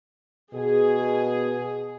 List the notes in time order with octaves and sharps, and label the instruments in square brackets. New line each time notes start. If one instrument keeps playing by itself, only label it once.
[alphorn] B2 [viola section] G#4